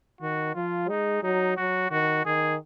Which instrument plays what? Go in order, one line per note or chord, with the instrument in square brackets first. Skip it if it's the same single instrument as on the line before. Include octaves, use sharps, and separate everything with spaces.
[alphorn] D#3 [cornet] F#4
[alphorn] F3 [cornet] F4
[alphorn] G#3 [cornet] D#4
[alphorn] F#3 [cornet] D#4
[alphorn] F#3 [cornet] F#4
[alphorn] D#3 [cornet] F#4
[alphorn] D#3 [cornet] G#4